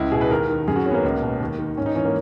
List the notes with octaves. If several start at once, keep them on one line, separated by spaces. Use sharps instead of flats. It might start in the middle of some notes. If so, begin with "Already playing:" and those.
Already playing: C#2 E4
B2 G#4
B4
D#2 A#4
D#3
F#2 G#4
F#4
D#3 C#4
B3
A#3
C#2
B2
D#2
D#3
G#2 C#4
D#4
E3 C#4
A#3